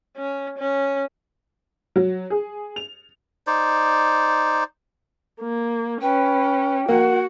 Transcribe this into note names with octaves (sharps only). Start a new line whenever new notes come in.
C#4
C#4
F#3
G#4
F7
D#4 C5 D5
A#3
C#4 B4 G5
A#3 F#4 F#5